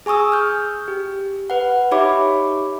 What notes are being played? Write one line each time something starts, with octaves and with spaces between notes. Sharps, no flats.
G#4 G#5 C#6 D#6 E6
F6 G6
G4
B4 F#5
D#4 G4 C#5 E5 B5 D6